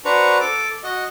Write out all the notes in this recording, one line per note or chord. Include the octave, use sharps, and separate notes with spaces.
D4 F#4 B4 C5 A#5 C#6
A4 D6
F#4 D#5